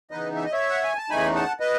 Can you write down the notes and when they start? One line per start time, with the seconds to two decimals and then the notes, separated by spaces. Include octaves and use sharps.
0.11 C#3 E3 B3 D#4 B4 D#5
0.36 E5
0.45 D#5
0.52 C#5 E5
0.70 F#5
0.84 G#5
0.97 A5
1.10 E2 C#3 E3 A3 D#4 G#5 B5
1.35 F#5 A5
1.60 B4 D#5